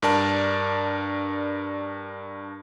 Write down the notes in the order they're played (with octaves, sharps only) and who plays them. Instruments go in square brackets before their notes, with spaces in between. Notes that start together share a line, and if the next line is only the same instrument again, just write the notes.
[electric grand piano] G2 D4 A#4 D5 A5